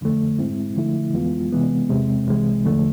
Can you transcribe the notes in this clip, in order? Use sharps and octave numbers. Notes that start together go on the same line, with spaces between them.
F2 D3 F3 A3
G#2 G#3 C4 E4
D3 F3 A3 E4
F2 E3 G#3 B3 F4
C3 E3 G#3 B3
E2 C3 G#3 C4
C2 C3 E3 G#3
E2 D3 F3 A3